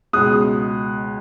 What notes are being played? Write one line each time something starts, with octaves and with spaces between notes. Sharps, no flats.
C#2 B2 G#3 D#6 F#6